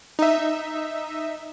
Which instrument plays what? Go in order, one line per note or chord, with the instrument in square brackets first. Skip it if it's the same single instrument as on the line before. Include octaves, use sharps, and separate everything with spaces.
[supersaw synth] D#4 E5